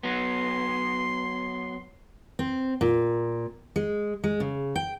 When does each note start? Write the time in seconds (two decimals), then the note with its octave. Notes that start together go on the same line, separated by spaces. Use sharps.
0.03 F#3 B3 C6
2.39 C4
2.81 A#2
3.76 G#3
4.24 G#3
4.40 C#3
4.76 G5